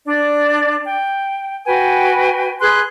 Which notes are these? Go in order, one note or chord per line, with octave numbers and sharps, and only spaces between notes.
D4 D5
G5
F#4 B4 G5 G#5
G#4 B4 C6 F#6